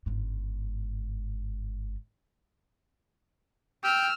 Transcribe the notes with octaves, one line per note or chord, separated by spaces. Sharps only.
G1 G#2
G5 E6 F6